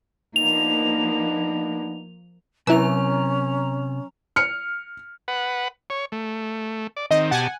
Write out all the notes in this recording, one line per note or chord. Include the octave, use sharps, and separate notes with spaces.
F3 A#3 B3 D4 D#4 F7
C3 F#3 C#4 E4 B4 A#5 E6 F7
F6 C#7
B4 F#5
C#5
A3
D5
D#3 C4 D#5
B2 G4 F#5 G#5 A5